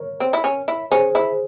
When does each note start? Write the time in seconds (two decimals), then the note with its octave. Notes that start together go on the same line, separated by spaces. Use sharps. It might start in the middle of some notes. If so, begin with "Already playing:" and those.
Already playing: A#4 C#5
0.20 C4
0.33 E4
0.44 C#4
0.68 E4
0.91 C#4 G#4 C5
1.15 E4